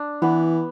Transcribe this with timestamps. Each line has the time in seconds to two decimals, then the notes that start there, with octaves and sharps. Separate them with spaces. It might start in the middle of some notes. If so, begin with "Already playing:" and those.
Already playing: D4
0.22 E3 B3